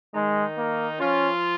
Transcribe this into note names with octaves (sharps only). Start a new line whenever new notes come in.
D#3 G#3 D#4
A#3
F3 C#4 F4